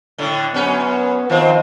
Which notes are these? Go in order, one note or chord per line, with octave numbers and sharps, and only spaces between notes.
A2 D3
F#2 B3 C#4 B4
D#3 F3 C4 C5